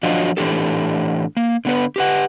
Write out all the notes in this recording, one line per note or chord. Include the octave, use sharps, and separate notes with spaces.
F3 F#3 D4 F4 F#4 D#5
A2 E3 D4 G4 A4
A#3
D3 B3 B4
G4 B4 F#5